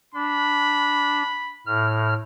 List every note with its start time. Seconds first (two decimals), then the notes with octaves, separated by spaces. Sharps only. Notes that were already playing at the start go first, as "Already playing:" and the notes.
0.14 D4 B5
1.66 A2 F6